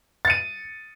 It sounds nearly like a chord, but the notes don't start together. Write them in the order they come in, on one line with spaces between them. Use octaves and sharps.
A6 C#7 D#7